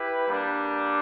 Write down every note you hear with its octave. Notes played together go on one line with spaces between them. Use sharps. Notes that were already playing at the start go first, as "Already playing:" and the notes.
Already playing: E4 G4 B4
G3 A#3 D4